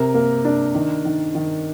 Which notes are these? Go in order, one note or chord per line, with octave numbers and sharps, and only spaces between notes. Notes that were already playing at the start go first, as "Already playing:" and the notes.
Already playing: C3 A#4
A#3
D4
D#3
D#3
D#3